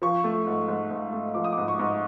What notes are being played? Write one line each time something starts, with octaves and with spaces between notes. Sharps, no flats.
F3 C#6
A3
G#2
G#2
G#2
A3
F3 D6
D#6
D6
G#2
C#6
G#2